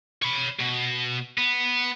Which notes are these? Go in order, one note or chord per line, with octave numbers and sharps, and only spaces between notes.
C#5 B5
B2
B3